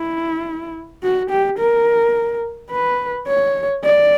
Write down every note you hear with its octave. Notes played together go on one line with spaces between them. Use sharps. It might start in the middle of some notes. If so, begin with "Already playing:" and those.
Already playing: E4
F#4
G4
A#4
B4
C#5
D5